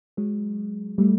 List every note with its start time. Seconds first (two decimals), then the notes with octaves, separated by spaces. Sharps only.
0.17 F#3 G#3
0.98 G3 A3